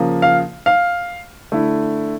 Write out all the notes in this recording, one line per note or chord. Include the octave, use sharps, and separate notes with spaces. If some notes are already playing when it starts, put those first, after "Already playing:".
Already playing: C#3 F3 A#3
F5
F5
D3 A3 E4